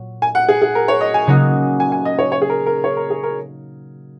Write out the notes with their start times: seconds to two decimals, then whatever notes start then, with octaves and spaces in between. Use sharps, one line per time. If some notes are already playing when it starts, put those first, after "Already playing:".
Already playing: A#2 F#3
0.22 G#5
0.35 F#5
0.49 G#4
0.62 G#4
0.75 A#4
0.88 C#5
1.01 D#5
1.14 G#5
1.27 C#3 F#3 A#3 D#4 F#4
1.80 G#5
1.92 G#5
2.05 D#5
2.19 C#5
2.32 C#5
2.42 G#4
2.50 A#4
2.66 A#4
2.84 C#5
2.97 A#4
3.10 G#4
3.23 A#4